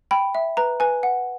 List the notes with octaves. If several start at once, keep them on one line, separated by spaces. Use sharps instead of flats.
G5 B5
E5
B4 A#5
B4 G#5
F#5